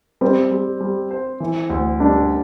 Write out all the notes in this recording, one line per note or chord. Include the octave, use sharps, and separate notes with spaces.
G3 C4
G3
G3
C5
E3
D2
G3 D4